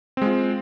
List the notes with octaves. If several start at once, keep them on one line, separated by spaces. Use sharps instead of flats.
G#3 C4 F4